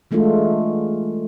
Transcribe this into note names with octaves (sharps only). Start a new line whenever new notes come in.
E3 G#3 A3 D4 F4